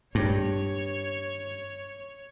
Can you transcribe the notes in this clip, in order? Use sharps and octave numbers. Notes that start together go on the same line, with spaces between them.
G2 C#5